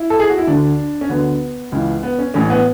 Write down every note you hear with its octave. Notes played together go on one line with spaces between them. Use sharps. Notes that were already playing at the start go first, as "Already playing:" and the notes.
Already playing: E4
A4
G#4
F#4
E4
D2 D3 D4
C#4
D2 D3 B3
C#2 C#3 E3
B3
C#4
A1 A2 E3 C#4
B3